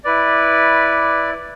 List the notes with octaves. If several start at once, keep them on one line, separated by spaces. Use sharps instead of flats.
E4 B4 D5